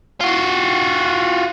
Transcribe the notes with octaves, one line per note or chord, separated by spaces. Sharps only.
F4 F#4